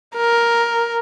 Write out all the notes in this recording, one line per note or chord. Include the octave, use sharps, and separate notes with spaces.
A#4